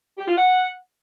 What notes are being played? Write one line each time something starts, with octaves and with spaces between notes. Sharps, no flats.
G4
F4
F#5